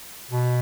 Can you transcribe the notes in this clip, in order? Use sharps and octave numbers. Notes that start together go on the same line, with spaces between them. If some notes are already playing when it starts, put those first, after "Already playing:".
B2